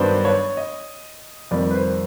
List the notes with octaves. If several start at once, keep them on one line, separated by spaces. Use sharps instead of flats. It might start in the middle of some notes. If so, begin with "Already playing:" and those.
Already playing: G2 D#3 F#3 B3 D4 C5
C#5
D#5
F2 C3 D#3 G3 D5
B4
C5